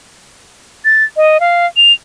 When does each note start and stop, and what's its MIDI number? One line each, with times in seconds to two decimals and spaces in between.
0.85 1.04 93
1.17 1.40 75
1.40 1.66 77
1.77 1.93 101